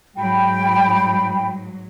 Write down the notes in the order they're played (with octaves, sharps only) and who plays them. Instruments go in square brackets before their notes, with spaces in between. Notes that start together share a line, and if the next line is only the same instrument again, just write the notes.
[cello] G#2 F#3 [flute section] G5 B5